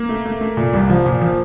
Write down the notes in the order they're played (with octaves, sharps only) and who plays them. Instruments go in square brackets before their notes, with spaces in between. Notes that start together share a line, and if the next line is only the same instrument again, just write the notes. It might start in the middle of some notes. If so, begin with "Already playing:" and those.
Already playing: [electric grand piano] A#3
[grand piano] A3
A3
A3
A#2
C2
F3
A#2
F3